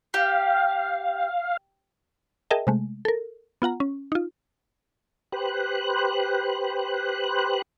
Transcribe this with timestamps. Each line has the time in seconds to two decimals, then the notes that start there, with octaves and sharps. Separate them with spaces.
0.14 G4 F5
2.51 G#4 A#4 D#5 E5 G5 A5
2.67 C3 G#3 A3
3.05 A4 A#4
3.62 B3 F4 F#5 A#5
3.80 C#4
4.12 D#4 F4
5.32 G4 B4 C5 F#6